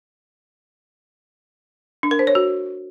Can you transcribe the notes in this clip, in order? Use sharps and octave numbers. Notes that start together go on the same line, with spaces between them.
D4
A#4
C5
C#5
F#4